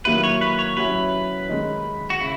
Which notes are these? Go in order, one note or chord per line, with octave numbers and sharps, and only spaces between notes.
D#3 F#3 A#3 E4 B4
C#5
B4
C#5
F#3 C#4 E4 B4
D#3 G#3 D#4
F#4
C#3 E4